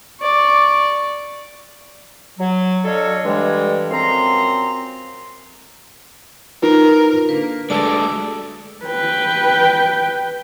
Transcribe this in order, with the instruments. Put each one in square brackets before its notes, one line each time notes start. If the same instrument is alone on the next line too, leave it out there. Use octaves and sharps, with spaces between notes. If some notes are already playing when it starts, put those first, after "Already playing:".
[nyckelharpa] D5 C#6
[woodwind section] F#3
F#3 D4 A4 C#5 D#5 F5
G2 D3 E3 G3 G#3
F#2 F3 C4 A#5 C6
[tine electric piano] D#4 F4 B4 [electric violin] A#4
[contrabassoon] D3 [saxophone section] A#3 [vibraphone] B4
[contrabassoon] D2 [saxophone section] G2 D3 D5 [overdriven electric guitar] G#3 A3 [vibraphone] A5 D6
[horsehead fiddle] B4 G5